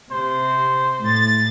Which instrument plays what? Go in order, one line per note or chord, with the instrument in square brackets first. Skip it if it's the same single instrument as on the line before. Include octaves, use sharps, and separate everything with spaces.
[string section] C3 [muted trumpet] C5
[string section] A2 A6